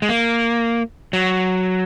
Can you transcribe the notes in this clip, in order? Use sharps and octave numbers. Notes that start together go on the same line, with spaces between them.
G#3
A#3
F#3